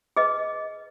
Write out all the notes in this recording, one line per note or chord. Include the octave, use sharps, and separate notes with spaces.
G#4 B4 D#5